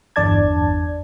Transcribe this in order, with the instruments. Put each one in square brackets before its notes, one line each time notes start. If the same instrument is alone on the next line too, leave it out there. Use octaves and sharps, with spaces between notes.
[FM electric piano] G1 E2 D4 D5 A5 G#6